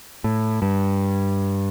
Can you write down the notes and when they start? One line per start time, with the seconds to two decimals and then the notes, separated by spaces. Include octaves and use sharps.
0.24 A2
0.62 G2